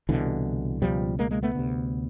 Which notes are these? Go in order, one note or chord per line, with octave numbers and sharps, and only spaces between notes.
C2 B2 D3 E3
C#2 B2 F3 G3
G#3 A#3
G#3 A#3
A3 B3
D2 C3